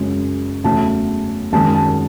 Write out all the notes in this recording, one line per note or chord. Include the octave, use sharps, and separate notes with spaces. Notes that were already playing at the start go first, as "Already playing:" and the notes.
Already playing: F#2 C#3 G#3
E2 C#3 F#3 A3 A5
F#2 D#3 G#3 A5
A5